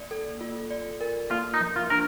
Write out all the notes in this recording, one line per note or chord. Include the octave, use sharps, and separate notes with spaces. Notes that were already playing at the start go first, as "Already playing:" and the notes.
Already playing: A#3 D5
A4
F4
D5
A#4
A#3 F4
D#4
F3
F4
D4 A#4